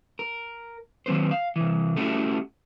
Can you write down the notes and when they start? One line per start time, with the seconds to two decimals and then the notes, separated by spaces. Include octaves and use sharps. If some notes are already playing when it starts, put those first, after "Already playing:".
0.19 A#4
1.06 D#3 F#3 C4 B4 C5
1.31 F5
1.56 C3 E3
1.96 A3 C#4 E4 F#4 G4 A4